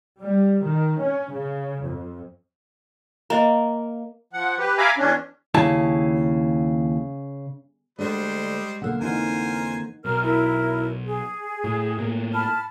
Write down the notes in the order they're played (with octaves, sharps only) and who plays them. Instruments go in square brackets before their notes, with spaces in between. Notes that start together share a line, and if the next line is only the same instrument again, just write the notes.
[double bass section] G3
D#3
C#4
C#3
F2
[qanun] A#3 [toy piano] D#5 A#5
[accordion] F3 F#5
G4 B4
E5 F5 G#5 A#5 B5 D6
E2 C#4 D4
[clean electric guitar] D#2 E4 A5 [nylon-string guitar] C#3
[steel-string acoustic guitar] D2 D3 D4 [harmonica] G3 C5 D#5 [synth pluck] G#3
[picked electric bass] B1 [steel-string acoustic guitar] D3 A#3 [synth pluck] F#5 E6
[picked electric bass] F2 E3 [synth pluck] D#4 F#5 [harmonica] A#4 C5 G#5
[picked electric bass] B1 [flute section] A#4 F6
[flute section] E4 A#4
G#4
[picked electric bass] A2
A2 A#3
[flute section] A5 B5 F6